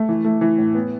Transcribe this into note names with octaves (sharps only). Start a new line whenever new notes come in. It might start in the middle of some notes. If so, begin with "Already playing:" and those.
Already playing: A3
E3
A3
E3
A2
B3